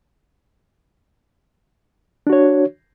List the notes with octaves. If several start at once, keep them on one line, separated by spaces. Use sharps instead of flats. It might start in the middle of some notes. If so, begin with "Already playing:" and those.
D4 F#4 C#5